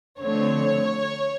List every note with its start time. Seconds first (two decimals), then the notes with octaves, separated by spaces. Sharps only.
0.20 D3 F3 A3 C4 C#5